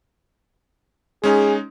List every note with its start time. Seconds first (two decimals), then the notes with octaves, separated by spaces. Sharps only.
1.24 G#3 C#4 D#4 G#4